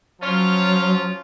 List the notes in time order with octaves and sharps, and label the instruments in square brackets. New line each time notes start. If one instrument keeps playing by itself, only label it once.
[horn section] F3 C#4 F4 [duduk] F#3